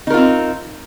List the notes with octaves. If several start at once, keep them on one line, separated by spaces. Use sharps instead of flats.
C4 D#4 F4 A#4